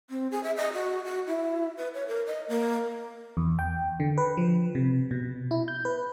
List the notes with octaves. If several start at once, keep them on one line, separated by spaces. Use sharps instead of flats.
C4
G#4
E5
D#5
F#4
F#4
E4
B4
C#5
A#4
D#5
A#3
E2
G5
D3
B4
F3
C3
B2
E4
G6
B4